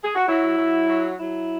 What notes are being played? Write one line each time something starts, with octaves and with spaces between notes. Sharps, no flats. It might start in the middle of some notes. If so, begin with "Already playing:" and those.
G#4
F#4
F#3 E4
F#3
F#3
F#3 E4